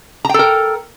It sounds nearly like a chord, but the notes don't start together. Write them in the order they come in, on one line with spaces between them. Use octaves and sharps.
A#5 G5 A4 A#4